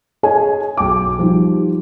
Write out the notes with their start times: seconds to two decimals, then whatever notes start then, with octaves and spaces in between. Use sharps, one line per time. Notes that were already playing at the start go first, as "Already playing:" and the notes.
0.23 G#4 C#5 D#5 G#5
0.77 B1 G5 D6
1.19 F3 G3 D#4